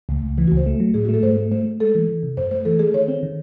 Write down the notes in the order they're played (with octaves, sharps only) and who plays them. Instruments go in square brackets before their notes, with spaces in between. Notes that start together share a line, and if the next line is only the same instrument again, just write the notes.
[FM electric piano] C#2 [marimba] A3
[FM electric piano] C#2
[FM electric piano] E3 [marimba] E4
[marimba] F#4
[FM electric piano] C#2 [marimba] C5
[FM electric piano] A3
F#3
[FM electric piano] A2 [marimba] G#4
[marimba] F#4
[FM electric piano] A3 [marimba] A4
[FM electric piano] G#2 [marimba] C5
[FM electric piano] A3
[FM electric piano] A3 [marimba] C5
[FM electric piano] A3
[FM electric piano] G#3 [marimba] A4
[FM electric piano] E3
E3
C3
[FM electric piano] F#2 [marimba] C5
[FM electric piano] A3 [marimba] C5
[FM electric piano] E3 [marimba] A4
[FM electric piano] A3 [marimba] G#4
[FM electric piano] D#3 [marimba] C#5
[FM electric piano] C4
D#3